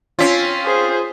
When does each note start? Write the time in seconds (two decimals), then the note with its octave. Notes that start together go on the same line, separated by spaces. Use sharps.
0.19 C4 C#4 F4 B6
0.65 G#4 C5